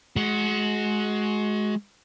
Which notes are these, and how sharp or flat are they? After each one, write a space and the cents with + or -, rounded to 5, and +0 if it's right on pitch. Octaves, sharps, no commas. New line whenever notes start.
G#3 +25 F#4 +0